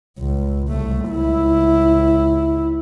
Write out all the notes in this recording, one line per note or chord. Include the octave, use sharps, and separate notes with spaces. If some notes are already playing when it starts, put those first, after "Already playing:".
C#2
C2 A3
C#2 E4